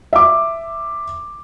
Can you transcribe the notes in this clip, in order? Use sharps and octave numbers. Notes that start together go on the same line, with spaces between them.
E5 D6